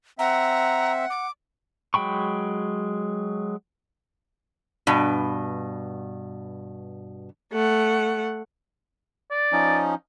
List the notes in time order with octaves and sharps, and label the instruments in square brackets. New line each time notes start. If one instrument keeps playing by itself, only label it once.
[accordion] C4 E5 [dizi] F#5 [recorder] A#5
[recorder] D6
[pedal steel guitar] F#3 G#3 G5 B5 C#6
[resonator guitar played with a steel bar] G2 B2
[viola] A3 F#5
[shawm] D5
[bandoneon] F3 C#4 D#4